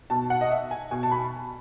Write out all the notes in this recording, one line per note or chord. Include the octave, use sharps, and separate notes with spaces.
B2 A5
F#5
D#5
E5
G#5
B2 G#5
A5
B5